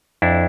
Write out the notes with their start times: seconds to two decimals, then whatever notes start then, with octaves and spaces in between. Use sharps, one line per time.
0.22 F2 D4 E4